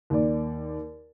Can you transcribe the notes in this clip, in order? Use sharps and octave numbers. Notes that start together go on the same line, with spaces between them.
D#2 D5